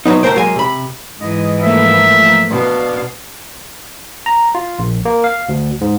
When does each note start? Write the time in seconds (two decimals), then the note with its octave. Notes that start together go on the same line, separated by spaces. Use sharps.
0.06 C3 F#3 B3 D#4
0.23 D2 A3 A#4 C5 G5
0.35 F#3 G#3 A#3 G#5
0.56 C3 B5
1.20 G#2 E3 D#5
1.62 F3 A3 A#3 E5
2.50 B2 D4 F5
4.26 A#5
4.55 F4
4.79 A#1
5.05 A#3
5.24 F5
5.49 D2
5.81 G#2